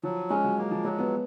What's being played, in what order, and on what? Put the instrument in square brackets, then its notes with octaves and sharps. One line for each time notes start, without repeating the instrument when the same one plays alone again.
[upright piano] F3 [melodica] F#3
[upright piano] G#3 [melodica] C#4
[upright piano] F#3
[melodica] A#3
[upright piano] F3
[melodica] F#3 [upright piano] G#3
[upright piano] B3